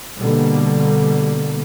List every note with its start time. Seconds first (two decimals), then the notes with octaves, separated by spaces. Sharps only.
0.18 B2 D3 G3 A#3